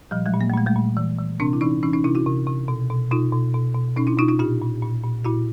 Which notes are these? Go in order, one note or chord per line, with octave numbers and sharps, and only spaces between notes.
A#2 F3 G3
F#3 G#3
A#2
A#3
A3
A#2 G#3
G3 A3
A#2
E3
E3
C3 C4 D4
E4
E3 C#4 D#4
E3 C#4 D#4
C#4 D#4
C3 D4 E4
E4 F#4
C3
C3
B2
B2
B2 D#4 F4
B2
B2
B2
B2 C#4 D#4
D4 E4
B2 D#4 F4
D#4 F4
A#2 F4 G4
A#2
A#2
A#2
A#2 E4 F#4